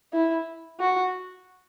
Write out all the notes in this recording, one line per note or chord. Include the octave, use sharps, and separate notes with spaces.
E4
F#4